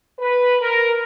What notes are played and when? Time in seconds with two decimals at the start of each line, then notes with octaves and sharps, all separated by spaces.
0.19 B4
0.62 A#4